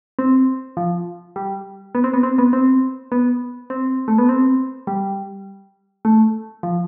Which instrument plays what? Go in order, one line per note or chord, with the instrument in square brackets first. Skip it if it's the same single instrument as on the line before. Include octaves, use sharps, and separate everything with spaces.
[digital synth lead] C4
F3
G3
B3
C4
B3
C4
B3
C4
B3
C4
A3
B3
C4
G3
A3
F3